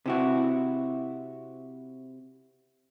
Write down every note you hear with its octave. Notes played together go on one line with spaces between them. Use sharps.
C3 E4 F#4